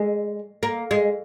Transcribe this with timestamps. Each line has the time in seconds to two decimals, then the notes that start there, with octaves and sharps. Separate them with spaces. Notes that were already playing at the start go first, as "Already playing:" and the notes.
Already playing: G#3
0.63 A#3
0.91 G#3